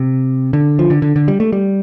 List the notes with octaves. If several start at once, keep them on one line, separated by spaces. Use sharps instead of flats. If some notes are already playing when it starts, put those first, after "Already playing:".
Already playing: C3
D3
F3
D3
D3
D3
G3
A3
G3